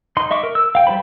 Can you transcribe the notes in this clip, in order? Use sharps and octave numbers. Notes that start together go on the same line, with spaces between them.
D#4 C6
D#5 E5 C#6 D6
A#4
E6
F5 G5
G3 F4 C5 B5